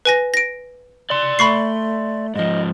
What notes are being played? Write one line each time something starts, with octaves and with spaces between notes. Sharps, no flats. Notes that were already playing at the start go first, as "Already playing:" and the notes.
B4 G#5 A#6
A#6 D7
D5 C6
A3 B5 C#6 C7
G#2 F3 D#5